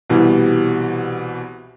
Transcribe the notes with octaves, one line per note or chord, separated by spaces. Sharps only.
C2 B2 E3 G3